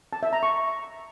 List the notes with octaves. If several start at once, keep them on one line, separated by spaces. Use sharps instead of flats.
A5
E5
A#5
C#6